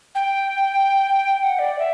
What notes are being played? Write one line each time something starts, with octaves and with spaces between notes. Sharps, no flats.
G5
G5
F#5
D5
E5